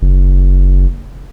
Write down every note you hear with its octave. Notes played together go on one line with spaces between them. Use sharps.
F#1